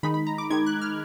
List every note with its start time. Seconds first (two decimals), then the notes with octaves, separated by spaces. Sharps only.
0.03 D#3 G#3 D#4 B5
0.14 B5
0.27 A#5
0.38 D6
0.50 D#3 G#3 D#4 G#6
0.66 F#6
0.81 F6